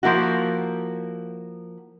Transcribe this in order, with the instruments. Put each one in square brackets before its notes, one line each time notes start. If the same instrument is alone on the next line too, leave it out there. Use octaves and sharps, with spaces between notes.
[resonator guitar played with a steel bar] F3 A#3 E4 F#4